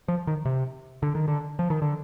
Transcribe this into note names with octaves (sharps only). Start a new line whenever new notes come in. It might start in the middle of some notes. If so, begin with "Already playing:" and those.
F3
D#3
C3
D3
D#3
D3
F3
D#3
D3